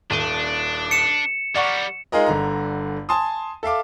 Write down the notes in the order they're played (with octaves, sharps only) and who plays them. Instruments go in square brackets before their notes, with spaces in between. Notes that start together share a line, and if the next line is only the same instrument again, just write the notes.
[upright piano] D#1 D#7 G7 [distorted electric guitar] D4
[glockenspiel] C#7 E7
[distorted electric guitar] G3 A#4 [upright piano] D5 F#5 C#6
[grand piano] G#3 D#4 F4 G#4 A#4 D#5
G1 D3 A#5
G#5 A5 C6 D#6
A4 E5 F5 D6